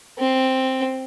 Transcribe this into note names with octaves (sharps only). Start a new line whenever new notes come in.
C4